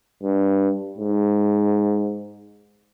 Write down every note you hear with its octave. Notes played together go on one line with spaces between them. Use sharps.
G2
G#2